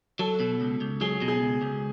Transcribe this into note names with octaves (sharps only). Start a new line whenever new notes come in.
F#3 A4
B2
C#2
C#2
F#3 G#4
B2
G#4
C#2
C#2